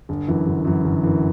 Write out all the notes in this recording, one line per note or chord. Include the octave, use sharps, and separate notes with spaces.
G1
F#2 E3
G1
F#2 E3
G1
F#2 E3